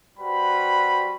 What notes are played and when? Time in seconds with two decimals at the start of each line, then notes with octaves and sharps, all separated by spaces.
0.19 G3 F#4 B4 C5 B5